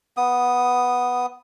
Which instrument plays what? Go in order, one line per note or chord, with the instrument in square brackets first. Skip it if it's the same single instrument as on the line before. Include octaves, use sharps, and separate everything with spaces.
[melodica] B3 D#6